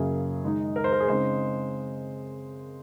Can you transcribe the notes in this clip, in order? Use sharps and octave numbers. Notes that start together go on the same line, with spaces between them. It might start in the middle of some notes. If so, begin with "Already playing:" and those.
Already playing: F#2 C#3 F#3 A#3 G#4
D#3 G#3 D#4
A#4
C5
A#4
G#4
C#3 G#3 C4 D#4 C5